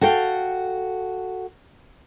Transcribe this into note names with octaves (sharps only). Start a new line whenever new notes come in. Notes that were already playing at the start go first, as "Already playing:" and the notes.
F#4 A4 F5 G5